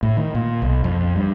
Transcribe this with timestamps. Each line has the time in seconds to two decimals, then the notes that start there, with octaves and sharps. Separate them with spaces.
0.03 A2
0.17 D#3
0.35 A#2
0.62 B1
0.84 F2
1.16 G2